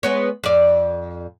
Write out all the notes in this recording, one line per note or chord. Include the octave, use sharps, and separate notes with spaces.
G#3 B3 C#5
F2 D5